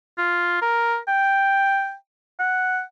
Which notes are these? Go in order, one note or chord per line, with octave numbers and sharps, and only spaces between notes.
F4
A#4
G5
F#5